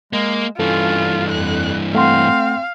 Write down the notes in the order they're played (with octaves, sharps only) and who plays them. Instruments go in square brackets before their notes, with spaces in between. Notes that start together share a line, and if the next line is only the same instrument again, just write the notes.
[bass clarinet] G#3 [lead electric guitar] A#3
[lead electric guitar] G2 E3 [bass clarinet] C#4 [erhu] F4 [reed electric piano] A4
[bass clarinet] F2 [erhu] F#6
[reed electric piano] A3 F#5 C6 [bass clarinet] C4 [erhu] F5